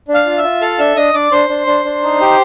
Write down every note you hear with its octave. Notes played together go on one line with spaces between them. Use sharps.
D4
F5 F6
F4
E5 E6
F4
A4 F5 F6
D4 E5 E6
D4 D#5 D#6
D4 D5 D6
D4 C5 C6
D4
D4
D4
D#4
G4